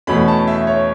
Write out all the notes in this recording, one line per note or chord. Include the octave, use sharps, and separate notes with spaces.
E2 B2 A3 C#4 B5
A5
E5
C#5